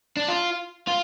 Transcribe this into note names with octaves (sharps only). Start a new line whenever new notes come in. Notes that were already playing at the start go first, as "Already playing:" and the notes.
D4
F4
F4